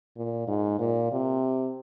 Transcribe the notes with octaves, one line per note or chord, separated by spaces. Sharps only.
A#2
G#2
A#2
C3